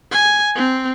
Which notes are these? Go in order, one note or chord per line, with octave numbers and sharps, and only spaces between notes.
G#5
C4